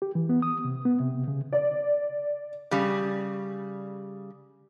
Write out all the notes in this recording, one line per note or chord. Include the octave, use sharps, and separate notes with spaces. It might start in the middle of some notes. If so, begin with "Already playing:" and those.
G4
E3
B3
D#6
C3
B3
C3
C#3
D5
C#3 G3